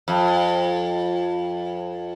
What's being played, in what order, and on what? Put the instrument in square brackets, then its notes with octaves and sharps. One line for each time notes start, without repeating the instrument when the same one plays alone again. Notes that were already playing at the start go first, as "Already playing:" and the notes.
[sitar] F2